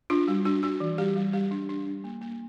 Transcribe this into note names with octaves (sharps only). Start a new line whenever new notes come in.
D4 F4
G3 F#4
D4 F#4
D4 F#4
E3
G3 G4
G3
G3 G4
D4
D4
D4
A#3
A#3